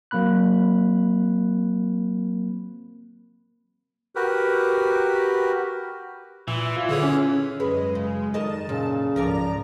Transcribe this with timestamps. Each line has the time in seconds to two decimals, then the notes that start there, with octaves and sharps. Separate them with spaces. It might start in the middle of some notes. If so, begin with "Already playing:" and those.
0.11 F#3 A#3 C4 B5 F#6
4.15 F#4 G4 A#4 B4
6.48 A#2 E3
6.76 F4
6.89 D3 G#4 C#5
7.03 C#4
7.60 F#2 G#3 B4
7.95 C#3
8.34 D#3 A#4 D#5 A5
8.69 A#2 C#3
9.16 C#2 G#2 F3 A#4 D5 A#5